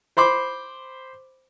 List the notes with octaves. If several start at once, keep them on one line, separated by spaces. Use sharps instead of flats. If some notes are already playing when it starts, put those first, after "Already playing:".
C5 B5 C6 D6